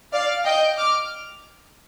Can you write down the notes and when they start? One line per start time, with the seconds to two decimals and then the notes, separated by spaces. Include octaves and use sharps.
0.13 D5 F5
0.45 D#5 G5
0.77 D6 F6